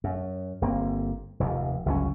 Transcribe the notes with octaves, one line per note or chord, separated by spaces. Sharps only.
F#2
G1 A#3 C4
F1 D#2
G1 C#2 F#3 C#4